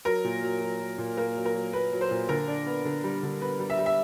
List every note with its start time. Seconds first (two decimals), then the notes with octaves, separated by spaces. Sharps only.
0.05 F#3 A#4
0.24 A#2
0.43 F#3
0.61 F#3
0.79 F#3
0.98 A#2
1.17 A#3 A#4
1.36 F#3
1.45 A#4
1.54 F#3
1.73 A#3 B4
1.93 F#3
2.01 C5
2.11 A#2
2.29 D3 A#4
2.48 D4
2.66 B3
2.85 D3
3.04 G3
3.23 D3
3.41 B3 B4
3.60 G3
3.70 E5
3.78 G3
3.86 E5